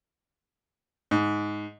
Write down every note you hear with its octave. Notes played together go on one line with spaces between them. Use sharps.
G#2